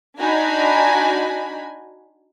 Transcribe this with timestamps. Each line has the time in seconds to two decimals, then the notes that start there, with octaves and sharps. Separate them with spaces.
0.18 D4 D#4 F#4 G#5 B5